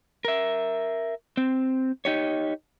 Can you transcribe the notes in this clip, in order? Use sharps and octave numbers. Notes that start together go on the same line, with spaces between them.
A#4 E5
C4
D#4 G4 C#5